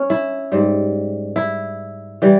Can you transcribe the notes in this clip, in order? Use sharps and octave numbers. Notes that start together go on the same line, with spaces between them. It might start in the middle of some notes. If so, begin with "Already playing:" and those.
Already playing: C#4
E4
G#2 G3
E4
E3 G3